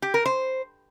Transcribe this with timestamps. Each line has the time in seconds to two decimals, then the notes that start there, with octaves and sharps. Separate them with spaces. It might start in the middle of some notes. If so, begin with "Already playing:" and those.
0.02 G4
0.14 A#4
0.26 C5